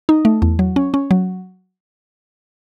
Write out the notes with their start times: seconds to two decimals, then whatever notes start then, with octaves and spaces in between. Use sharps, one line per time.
0.09 D#4
0.25 A3
0.42 E2
0.59 F#3
0.76 C#4
0.94 C#4
1.11 F#3